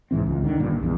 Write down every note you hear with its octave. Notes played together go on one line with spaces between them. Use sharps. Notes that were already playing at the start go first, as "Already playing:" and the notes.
C2 G#2 E3 C4
C#2
D3 D#3
G2 A#2
A#1
A#1 E2